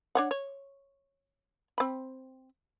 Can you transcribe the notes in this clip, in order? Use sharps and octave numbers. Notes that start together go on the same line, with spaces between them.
D4 C#5 F#5
C#5
C4 B5